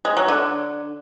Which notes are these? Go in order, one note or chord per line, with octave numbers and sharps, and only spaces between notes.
G#3
F#3
D3